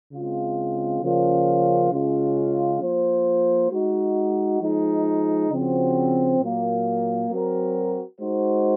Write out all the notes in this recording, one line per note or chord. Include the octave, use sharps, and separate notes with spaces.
C#3 G#3 C4 F4
C#3 F3 A#3 C#4 F4
C#3 G#3 C#4 F4
F3 A#3 F4 C5
G#3 D#4 F#4
F3 G#3 D#4
C#3 F3 C4 F#4
A#2 F#3 A#3
F#3 C4 F#4 A#4
G#3 D#4 F#4 C5